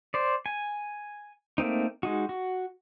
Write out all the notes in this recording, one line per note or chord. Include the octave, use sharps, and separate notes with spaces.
C5 D5
G#5
A3 A#3 C4 D#4
G#3 D#4 F#4
F#4